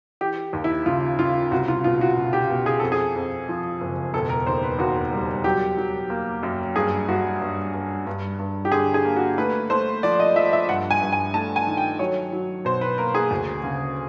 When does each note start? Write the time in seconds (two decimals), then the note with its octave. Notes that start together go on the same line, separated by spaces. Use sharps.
0.21 E3 G4
0.53 D#2
0.64 E4
0.86 C#3 F4
1.19 C#3 F4
1.51 C2 F#4
1.68 F4
1.84 B2 F4
2.01 F#4
2.17 B2
2.33 G4
2.50 B2
2.66 G#4
2.80 F2 A4
2.92 G#4
3.16 F2
3.49 F3
3.81 F#1
4.13 E1 A4
4.29 A#4
4.47 D#2 C5
4.63 B4
4.79 D#2 F#4
5.12 G3
5.44 F#3 G4
5.77 F#3
6.10 A#3
6.43 F#2
6.76 G2 G#4
7.08 G2 F#4
7.41 G2
7.74 G2
8.07 G2
8.39 G2
8.65 G4
8.72 D3 G#4
8.94 G#4
9.05 A#3
9.16 F#4
9.38 A3 B4
9.70 A3 C5
10.03 F3 D5
10.20 D#5
10.36 F3 E5
10.53 E5
10.69 G2 F#5
10.91 G#5
11.01 G2
11.12 G#5
11.34 A3 A5
11.56 G#5
11.67 D#3
11.77 G5
11.99 F#3 C#5
12.32 F#3
12.65 B2 C5
12.81 B4
12.98 A#3 A#4
13.15 G#4
13.31 D2
13.64 C#3